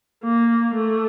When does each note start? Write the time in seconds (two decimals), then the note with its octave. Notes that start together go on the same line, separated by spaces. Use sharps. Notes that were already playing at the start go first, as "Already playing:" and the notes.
0.24 A#3
0.75 A3